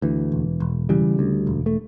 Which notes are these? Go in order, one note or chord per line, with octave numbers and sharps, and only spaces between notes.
D2 E3
E1
E1
C#3 E3 G3
D2
E1
A3